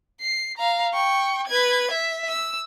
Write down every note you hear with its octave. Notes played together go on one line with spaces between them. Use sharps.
C7
F5 A#5
G5 C#6
B4 G#6
E5
E6